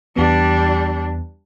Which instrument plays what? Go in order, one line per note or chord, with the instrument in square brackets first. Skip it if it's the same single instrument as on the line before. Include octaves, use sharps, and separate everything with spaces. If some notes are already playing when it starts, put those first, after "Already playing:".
[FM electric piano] E2 E3 B3 [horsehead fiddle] G3 D4